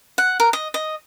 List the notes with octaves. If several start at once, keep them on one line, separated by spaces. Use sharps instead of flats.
F#5
A#4
D#5
D#5